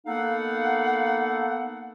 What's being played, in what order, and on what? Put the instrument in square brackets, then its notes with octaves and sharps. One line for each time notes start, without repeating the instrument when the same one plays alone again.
[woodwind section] A#3 B3 D#4 A4 F5 F#5